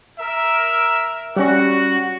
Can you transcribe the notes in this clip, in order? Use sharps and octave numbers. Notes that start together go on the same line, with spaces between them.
A#4 E5
G3 C#4 F#4